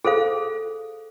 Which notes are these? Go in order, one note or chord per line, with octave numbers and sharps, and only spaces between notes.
G#4 A4 C5 F5